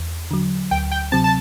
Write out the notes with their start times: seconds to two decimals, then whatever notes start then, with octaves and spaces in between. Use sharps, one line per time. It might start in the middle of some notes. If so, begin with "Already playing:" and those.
Already playing: E2
0.31 D3 F#3
0.71 D2 G5
0.91 G5
1.12 C3 F#3 C4 A5
1.24 A5